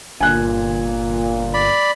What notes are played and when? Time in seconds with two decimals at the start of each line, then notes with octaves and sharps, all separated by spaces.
0.21 G1 A#2 G#5 F#6
1.54 D5 B5